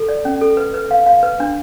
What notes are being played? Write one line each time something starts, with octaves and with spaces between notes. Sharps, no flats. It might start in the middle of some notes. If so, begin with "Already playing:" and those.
Already playing: A4
D5
C#4
A4
B4
B4
F5
F5
B4
D4